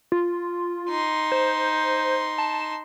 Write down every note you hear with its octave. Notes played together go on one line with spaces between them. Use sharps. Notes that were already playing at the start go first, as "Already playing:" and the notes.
F4
D#4 C6
C5
A5